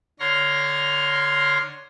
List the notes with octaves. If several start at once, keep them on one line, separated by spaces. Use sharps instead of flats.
D3 C#5 A#5 C6 F6